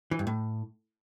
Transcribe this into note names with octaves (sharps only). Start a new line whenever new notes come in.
E3
G2
A2